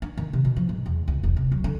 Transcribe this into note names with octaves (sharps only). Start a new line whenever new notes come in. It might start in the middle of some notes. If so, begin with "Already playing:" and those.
D4
D#3
C3
B2
F3
G#2
E2
C#2
E1
C3
F#3
D3